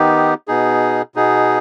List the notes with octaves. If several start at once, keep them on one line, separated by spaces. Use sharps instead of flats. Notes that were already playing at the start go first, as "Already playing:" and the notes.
Already playing: D#3 B3 D#4 G4
B2 B3 D#4 G#4
B2 B3 D#4 G#4